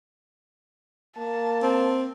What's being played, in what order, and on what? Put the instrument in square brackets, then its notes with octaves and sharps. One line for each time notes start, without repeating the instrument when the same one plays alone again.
[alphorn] A#3 [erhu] A5
[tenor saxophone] C4